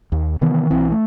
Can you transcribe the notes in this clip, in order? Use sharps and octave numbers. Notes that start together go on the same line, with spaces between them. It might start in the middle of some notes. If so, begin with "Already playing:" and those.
D#2
C3 D#3 E3 B3
B1 E3 C4
A3